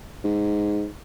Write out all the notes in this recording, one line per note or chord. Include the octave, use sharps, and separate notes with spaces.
G#2